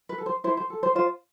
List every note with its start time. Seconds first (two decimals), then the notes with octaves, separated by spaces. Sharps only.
0.09 B4
0.18 A4
0.26 C5
0.44 E4 C5
0.57 C5
0.70 A4
0.83 C5
0.95 F4 C5